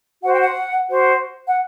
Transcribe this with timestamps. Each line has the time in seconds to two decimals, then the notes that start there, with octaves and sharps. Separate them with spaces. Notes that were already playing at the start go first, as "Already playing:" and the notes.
0.22 F#4 C5 F#5
0.32 G5
0.41 F#5
0.90 F#4 C5
1.48 F#5